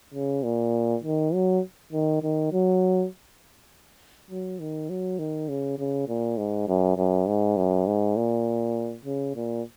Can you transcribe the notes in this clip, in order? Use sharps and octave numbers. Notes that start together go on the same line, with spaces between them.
C#3
A#2
D#3
F#3
D#3
D#3
F#3
F#3
D#3
F#3
D#3
C#3
C#3
A#2
G#2
F#2
F#2
G#2
F#2
G#2
A#2
C#3
A#2